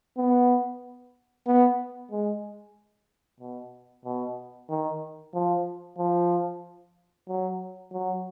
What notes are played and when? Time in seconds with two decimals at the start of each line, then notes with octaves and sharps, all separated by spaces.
0.17 B3
1.47 B3
2.11 G#3
3.40 B2
4.05 B2
4.70 D#3
5.34 F3
5.98 F3
7.28 F#3
7.92 F#3